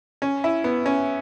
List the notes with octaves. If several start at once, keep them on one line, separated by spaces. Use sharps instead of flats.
C#4
E4
B3
C#4